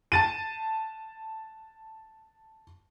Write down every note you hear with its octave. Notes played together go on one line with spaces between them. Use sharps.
A5 A6 D#7